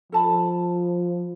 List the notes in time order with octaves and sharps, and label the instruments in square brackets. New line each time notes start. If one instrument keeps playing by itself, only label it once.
[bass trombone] F3 [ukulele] A4 A5 B5